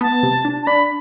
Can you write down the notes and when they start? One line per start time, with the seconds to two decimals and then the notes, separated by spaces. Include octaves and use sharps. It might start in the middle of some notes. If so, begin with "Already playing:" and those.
0.01 B3 A5
0.23 C3
0.45 D4
0.62 A5
0.66 D4 B5